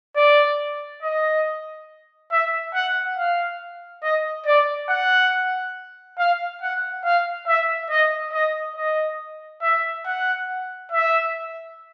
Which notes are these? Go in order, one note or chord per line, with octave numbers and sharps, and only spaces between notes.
D5
D#5
E5
F#5
F5
D#5
D5
F#5
F5
F#5
F5
E5
D#5
D#5
D#5
E5
F#5
E5